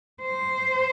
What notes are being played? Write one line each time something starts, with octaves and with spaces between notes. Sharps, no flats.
C5